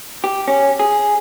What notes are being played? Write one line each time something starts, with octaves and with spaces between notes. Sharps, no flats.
G4
C#4
G#4